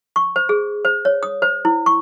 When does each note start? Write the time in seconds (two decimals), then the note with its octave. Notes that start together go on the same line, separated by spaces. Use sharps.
0.16 C#6
0.36 C5
0.49 G#4
0.85 C5
1.05 C#5
1.23 D#6
1.42 C5
1.65 E4
1.86 C#6